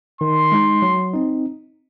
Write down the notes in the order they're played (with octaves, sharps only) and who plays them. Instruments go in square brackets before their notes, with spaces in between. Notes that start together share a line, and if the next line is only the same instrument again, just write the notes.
[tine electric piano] D#3 [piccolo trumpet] C6
[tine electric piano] G#3 D#4
F#3
C4 D#4